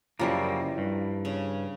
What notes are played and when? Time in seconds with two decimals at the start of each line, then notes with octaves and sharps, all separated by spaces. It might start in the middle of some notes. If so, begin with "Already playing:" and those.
0.19 F#2 C#3 F3 G3 A#3 E4
0.78 G2
1.25 C#3